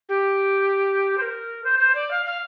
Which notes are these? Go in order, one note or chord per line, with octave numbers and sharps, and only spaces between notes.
G4
C5
A#4
C5
C5
D5
F5
F5